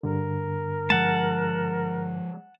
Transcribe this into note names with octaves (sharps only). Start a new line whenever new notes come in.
G2 D3 A#4
F3 G#3 F#5 A5